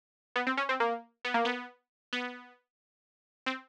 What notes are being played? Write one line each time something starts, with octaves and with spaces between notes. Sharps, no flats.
B3
C4
C#4
C4
A#3
B3
A#3
B3
B3
C4